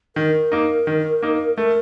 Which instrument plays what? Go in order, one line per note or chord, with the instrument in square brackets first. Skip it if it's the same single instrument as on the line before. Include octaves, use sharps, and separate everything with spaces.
[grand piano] D#3 [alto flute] A#4
[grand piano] A#3 D#4
D#3
A#3 D#4
[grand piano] A3 [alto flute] A#4